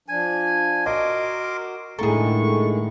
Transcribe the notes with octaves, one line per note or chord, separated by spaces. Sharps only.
F3 D4 G#5
F#4 A#4 D#5 C6 D6
A2 D3 D#3 G#3 G#4 A4 A#5 C#6